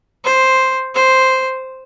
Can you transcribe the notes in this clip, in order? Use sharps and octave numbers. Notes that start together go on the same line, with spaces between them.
C5
C5